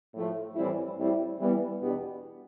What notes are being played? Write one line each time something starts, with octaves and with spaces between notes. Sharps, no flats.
A2 F3 A3
A2 E3 G3 C4 E4
A2 G3 C4 E4 G4
E3 G3 B3
E2 B2 B3 D4 G4